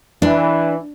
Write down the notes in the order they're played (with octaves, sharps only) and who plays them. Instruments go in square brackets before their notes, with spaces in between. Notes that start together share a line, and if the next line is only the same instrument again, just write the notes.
[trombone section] E3 [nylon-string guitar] D4